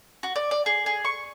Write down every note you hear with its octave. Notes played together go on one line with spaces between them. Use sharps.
F#4
D5
D5
G#4
G#4
C#6